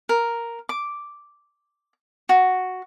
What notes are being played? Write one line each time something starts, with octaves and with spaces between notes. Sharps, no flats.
A#4
D6
F#4